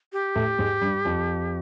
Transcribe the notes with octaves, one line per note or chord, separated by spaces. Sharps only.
G4
A2 A3
G#2 G#3
G2 G3
F2 F3